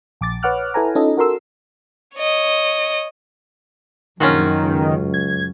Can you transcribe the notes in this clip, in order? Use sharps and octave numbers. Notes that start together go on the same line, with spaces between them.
A#1 D6 A6
B4 C#5 F#5 D6 F6 F#6
E4 A4 B4 G#5 A#5
C#4 D#4 F4 A4 D#5
F#4 A4 A#4 C6 E6
C#5 D#5
A#1 F#2 D#3 C#4 F4 F#4
C#2
G#6